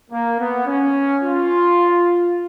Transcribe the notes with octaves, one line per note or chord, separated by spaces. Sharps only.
A#3
B3
C#4
F4